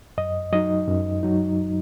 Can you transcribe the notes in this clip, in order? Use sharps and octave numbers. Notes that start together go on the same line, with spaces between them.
F#2 D#5
F#3 D#4 D#5
F#2
F#3 D#4